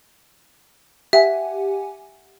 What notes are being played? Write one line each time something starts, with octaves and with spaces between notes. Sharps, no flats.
G4 E5 F#5 G#5